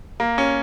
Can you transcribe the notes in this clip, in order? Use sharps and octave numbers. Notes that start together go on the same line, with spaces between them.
A#3
C#4